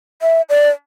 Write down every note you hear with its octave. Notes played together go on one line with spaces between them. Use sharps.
E5
D5